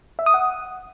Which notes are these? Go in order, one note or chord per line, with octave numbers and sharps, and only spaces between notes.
E5
D#6
F#5